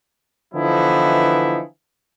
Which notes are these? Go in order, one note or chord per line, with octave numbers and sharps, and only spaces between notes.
D3 E3 F3 B3 D#4 E4